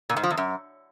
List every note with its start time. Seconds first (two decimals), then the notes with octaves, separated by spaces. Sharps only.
0.10 A#2
0.17 G#2
0.24 F3
0.31 E2
0.37 F#2